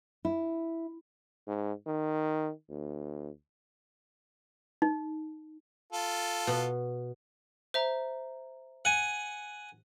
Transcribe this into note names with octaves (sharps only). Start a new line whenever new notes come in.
E4
G#2
D#3
D2
D#4
F4 A4
B2
C5 E5 A#5
F#5 G#5